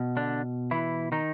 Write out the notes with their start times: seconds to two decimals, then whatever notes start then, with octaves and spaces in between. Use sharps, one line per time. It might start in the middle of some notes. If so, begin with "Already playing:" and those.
Already playing: B2
0.17 D3 D4
0.71 E3 E4
1.12 D#3 D#4